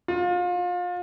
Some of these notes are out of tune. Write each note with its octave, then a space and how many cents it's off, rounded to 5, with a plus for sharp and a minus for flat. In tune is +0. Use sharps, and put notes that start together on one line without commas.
F4 +30